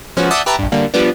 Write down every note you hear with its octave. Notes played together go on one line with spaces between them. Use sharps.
F3 G#3 B3 C#4 F#4
D5 E5 F#5 A5 D#6 G6
G4 B4 E5 A5 A#5
A#1 G2
D3 G3 A#3
F3 G3 B3 D4